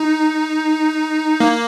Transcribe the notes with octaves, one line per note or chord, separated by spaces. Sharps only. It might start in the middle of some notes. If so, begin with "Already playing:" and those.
Already playing: D#4
A#3